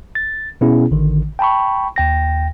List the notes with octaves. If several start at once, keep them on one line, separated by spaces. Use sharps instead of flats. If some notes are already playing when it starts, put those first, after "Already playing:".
A6
B2 B3 C#4 E4 G#4
A1 D3 D#3
G5 A5 B5 C#6
D#2 G5 A#6